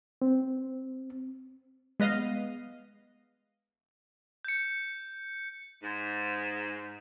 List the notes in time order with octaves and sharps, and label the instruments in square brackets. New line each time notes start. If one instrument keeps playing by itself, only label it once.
[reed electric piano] C4
[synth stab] G#3 B3 D#5 F5
[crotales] G6 C#7
[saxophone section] G#2